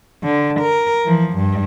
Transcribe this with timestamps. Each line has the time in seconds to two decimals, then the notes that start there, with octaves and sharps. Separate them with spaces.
0.23 D3
0.60 A#4
1.05 E3 F3
1.34 G2